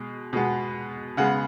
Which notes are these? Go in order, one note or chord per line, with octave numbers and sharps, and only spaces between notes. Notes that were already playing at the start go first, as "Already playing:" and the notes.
Already playing: B2 G#3
B2 G#3 B3
C#3 G#3 B3 F#5